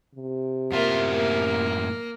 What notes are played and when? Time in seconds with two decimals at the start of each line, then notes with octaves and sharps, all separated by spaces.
0.15 C3
0.72 F#2 A2 A#3 F4 E5
1.13 A#3